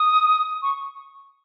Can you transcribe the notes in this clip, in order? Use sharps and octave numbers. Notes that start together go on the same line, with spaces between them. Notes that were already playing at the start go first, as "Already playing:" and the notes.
Already playing: D#6
C#6